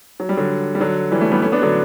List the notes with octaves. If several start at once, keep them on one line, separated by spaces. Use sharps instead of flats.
F#3
G3
D3 F#3
G3
D3 F#3
E3 G3
F#3 A3
G3 B3
A3 C#4
B3 D4
D3 F#3